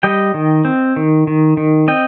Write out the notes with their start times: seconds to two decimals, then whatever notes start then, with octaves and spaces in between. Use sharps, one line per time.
0.03 G3 D#5 G5
0.34 D#3
0.65 C4
0.96 D#3
1.27 D#3
1.57 D#3
1.88 C4 D#5 G5